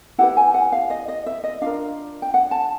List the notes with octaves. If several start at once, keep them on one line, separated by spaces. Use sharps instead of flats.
E4 G4 B4 F#5
G#5
F#5
F5
D#5
D#5
E5
D#5
D4 F4 A#4 F5
G5
F#5
A5